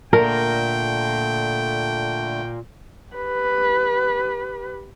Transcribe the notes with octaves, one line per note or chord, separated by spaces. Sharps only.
A#2 D3 A3 A#4 G5
G4 B4